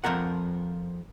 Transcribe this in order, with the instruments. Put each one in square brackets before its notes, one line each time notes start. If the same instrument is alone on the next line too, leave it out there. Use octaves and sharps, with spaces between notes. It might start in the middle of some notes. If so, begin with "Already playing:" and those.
[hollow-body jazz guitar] F2 E3 F3 A#4 F#5